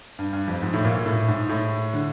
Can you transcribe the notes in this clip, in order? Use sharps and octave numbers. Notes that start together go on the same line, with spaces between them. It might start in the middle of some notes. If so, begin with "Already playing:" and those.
G2
G2
F2
G#2
A2
A#2
A#2
A2
G#2
A2
D3